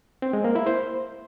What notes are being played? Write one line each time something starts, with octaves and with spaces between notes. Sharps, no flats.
C4
G#3
A#3
E4
C5